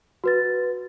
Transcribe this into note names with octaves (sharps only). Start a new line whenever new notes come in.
F#4 B4 A6